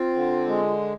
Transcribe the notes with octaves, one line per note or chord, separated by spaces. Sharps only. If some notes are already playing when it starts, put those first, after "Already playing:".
Already playing: C4 F4
D3
G#3